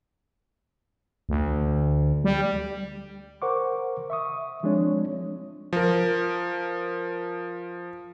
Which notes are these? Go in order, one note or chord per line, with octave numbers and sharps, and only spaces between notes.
D2
G3
A#4 C5 F#5 C#6 D6
E5 C#6 D#6
F3 G#3 C4 D4 C#5
F3 A#4